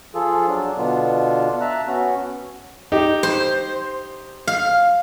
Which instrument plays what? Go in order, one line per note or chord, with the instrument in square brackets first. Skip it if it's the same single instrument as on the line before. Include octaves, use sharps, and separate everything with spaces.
[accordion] F3 F4 G#4 A4
F#3 D4
B2 D3 B3 D4 F4
E5 A5 A#5 F#6
B3 C#4 F#4
[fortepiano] D#4 G4
[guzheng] C5
F5